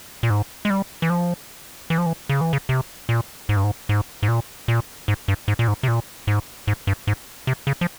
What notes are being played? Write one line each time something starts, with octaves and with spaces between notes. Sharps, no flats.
A#2
G#2
G#3
G3
E3
F3
E3
F3
E3
C#3
E3
C#3
C3
A#2
G#2
G2
G#2
G#2
G#2
A#2
A#2
G#2
G2
G#2
A#2
G#2
C3
A#2
G#2
G#2
G2
G#2
C3
C#3
F3